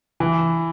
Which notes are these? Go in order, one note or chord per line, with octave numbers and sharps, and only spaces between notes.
E3